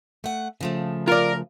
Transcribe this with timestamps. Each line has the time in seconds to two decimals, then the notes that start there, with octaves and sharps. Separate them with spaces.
0.24 A3 F#5
0.61 C#3 F3 A3
1.08 F4 A#4 D5